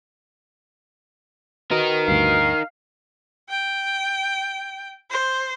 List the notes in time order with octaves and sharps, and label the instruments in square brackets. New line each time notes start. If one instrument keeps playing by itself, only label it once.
[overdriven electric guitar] D#4 A#4 [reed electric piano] F#4 B4 D#5
[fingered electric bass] D2 G2 [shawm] F5
[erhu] G5
C5